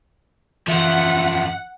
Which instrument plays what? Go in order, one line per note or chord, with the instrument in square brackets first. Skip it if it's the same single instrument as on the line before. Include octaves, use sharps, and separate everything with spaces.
[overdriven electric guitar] F#2 F3 [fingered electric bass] E3 [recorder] E5 [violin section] F#5